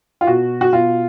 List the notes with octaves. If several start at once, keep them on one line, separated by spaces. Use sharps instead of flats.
F4
B2 F#4
F#4
B2 F4